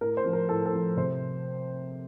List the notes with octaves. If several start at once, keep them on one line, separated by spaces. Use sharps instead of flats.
A2 A#4
C5
F3
A#4
A2 A4
A4
F3
C3 C5